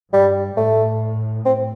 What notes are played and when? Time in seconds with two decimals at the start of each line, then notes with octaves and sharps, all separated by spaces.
0.13 G2 G3
0.56 A2 A3
1.45 C4